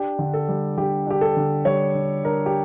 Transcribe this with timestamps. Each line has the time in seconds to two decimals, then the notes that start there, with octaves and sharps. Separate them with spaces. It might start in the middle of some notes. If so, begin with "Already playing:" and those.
Already playing: D4 G4
0.19 D3
0.34 A4
0.48 G3
0.77 D3 G4
1.07 D4 G4
1.21 A4
1.37 D3
1.65 G3 C#5
1.95 D3
2.24 D4 A#4
2.46 G4